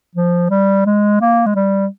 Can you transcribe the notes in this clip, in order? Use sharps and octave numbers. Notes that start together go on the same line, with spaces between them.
F3
G3
G#3
A#3
G#3
G3